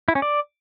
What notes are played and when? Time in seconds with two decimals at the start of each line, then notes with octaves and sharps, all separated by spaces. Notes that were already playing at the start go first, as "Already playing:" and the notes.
0.08 E4
0.15 C#4
0.22 D5